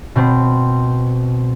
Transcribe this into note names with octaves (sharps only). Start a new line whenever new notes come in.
B2 C4